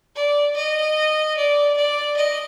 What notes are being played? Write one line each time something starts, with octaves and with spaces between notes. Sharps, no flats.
D5
D#5
D5
D5
D#5